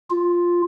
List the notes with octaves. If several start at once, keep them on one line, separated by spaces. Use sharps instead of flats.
F4